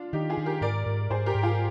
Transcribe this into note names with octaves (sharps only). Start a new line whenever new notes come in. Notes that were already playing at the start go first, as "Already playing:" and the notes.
Already playing: D4 F4
D#3 D#4 G4
F4 G#4
D#3
G4 A#4
G#2 A#4 D5
G#2
G#2 G#4 C5
G4 A#4
G#2
F4 G#4